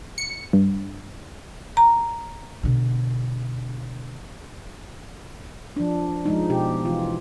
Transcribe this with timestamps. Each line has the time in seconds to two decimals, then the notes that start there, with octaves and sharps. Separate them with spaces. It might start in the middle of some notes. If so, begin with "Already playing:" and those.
0.18 C#7
0.53 G2
1.77 A#5
2.63 B2 D3
5.77 F3 D4
6.25 F3 G#3 D#4
6.49 B2 G4
6.85 E3 F4